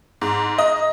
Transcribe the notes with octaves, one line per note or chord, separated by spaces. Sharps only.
G#2
D#5